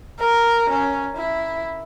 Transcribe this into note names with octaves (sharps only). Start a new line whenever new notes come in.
A#4
C#4
E4